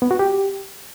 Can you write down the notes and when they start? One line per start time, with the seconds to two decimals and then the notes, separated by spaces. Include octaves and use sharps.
0.02 B3
0.11 F#4
0.19 G4